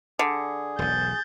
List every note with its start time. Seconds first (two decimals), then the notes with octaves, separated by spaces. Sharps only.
0.19 D3 G#4
0.79 E1 B1 G6 A6